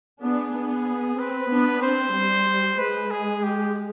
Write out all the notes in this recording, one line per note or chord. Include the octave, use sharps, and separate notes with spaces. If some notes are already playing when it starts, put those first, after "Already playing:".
B3 D4 G#4
B3
C4 B4
B3 D4
C4 C5
G3
G#3 B4
G#4
G4